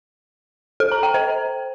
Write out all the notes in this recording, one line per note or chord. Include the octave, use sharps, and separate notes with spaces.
A4
A#5
G5
C5